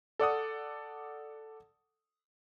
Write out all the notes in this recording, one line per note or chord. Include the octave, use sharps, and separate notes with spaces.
A4 D5 F#5 D#6